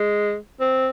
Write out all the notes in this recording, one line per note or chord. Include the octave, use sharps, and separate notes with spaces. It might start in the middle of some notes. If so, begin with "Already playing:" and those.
Already playing: G#3
C4